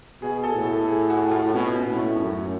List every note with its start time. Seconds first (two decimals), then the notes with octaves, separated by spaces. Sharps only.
0.22 B2 G#4
0.44 A4
0.54 A2
0.66 A4
0.88 G#4
1.10 F#4
1.31 F4
1.54 B2 C#4
1.87 A2
1.97 A3
2.20 F#2